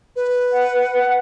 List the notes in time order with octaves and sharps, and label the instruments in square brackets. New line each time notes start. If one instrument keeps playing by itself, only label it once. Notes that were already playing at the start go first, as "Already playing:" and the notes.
[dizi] B4
[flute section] F#5